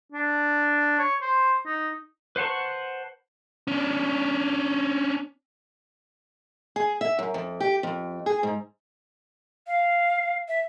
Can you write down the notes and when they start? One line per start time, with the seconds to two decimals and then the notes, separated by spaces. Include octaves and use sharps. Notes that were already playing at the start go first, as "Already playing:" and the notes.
0.12 D4
0.99 C#5
1.22 C5
1.66 D#4
2.36 B4 C5 F#5 A5 C#6
3.67 C#4 D4
6.76 G#4
7.01 E5
7.19 F#2
7.34 F2
7.60 G4
7.83 F2
8.26 G#4
8.43 G#2
9.67 F5
10.48 E5